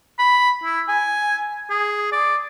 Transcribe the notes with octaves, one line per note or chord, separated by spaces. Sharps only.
B5
E4
G#5
G#4
D5